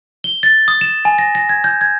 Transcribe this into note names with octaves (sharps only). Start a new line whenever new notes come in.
G7
A6
D#6
E7
G#5
A#6
A#6
G#6
G6
G#6